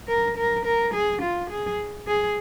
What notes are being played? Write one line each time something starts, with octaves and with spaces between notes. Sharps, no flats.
A#4
A#4
A#4
G#4
F4
G#4
G#4